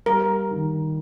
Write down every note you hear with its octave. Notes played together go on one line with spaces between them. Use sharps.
G3 A#4
D#3